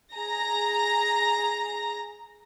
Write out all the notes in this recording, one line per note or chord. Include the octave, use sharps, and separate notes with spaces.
G#4 A#5 A#6